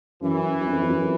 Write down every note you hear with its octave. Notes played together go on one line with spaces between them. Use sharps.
F#2 E3
F#2
F2
F2
F#2